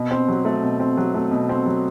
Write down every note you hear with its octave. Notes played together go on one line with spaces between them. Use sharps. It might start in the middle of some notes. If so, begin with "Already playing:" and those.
Already playing: B2
C4
F#3
A3
B2
C4
F#3
A3
B2
C4
F#3